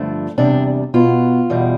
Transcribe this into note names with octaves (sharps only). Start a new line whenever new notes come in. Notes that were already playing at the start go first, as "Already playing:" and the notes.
Already playing: G2 D3 F3 A3 D4
E2 C3 G3 D4
B2 B3 F4
E2 B2 G3